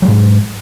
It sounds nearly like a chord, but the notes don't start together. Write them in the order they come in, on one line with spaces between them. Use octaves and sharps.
F#3 G#3 G#2